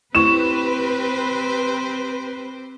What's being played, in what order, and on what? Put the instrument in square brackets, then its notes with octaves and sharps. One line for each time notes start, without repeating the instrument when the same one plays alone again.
[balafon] A3 E4 C#6 [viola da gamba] C4 G4 C5 [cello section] B4 [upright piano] E7